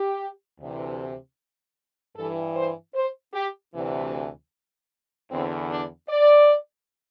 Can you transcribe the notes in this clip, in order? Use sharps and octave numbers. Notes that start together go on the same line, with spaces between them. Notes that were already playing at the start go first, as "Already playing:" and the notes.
Already playing: G4
D2 C3 E3
G2 E3 A4
C5
C5
G4
D2 C3 E3
E2 D3 C4
D4
D5